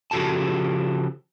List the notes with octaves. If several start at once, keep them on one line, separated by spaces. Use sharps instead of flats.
C#3 F3 F#4 G4 A4 A5